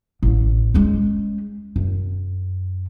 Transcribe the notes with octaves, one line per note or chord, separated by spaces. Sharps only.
A1
G#3 C#4
F#2